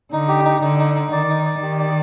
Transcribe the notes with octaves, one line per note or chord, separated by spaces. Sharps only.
D3 D#4
G4
D#4
D3 D#4
D#4
D#4
D#3 D5
D#4
D5
D#3 G4
D5